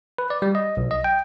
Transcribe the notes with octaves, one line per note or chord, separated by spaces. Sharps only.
B4
D5
G3
D#5
B1
D#5
G5